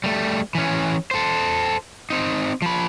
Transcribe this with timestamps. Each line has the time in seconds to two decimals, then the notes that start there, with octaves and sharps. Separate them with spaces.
0.04 G3 A3
0.55 E3 C#4
1.11 A4 C5
2.10 C4 D#4
2.62 F3 B5